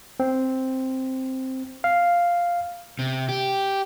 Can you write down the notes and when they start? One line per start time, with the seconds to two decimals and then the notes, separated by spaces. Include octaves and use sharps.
0.20 C4
1.84 F5
2.99 C3
3.29 G4